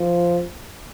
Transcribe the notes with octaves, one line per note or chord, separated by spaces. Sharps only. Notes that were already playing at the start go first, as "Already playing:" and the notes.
Already playing: F3